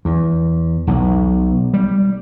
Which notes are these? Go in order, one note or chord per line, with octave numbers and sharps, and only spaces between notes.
E2
B1
G3